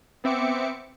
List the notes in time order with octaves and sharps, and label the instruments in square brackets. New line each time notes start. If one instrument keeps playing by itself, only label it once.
[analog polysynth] B3 C4 E5 D6 C#7